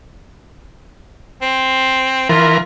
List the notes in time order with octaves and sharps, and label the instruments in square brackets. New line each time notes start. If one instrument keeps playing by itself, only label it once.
[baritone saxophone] C4
[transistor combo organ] E3 A#4 [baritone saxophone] F4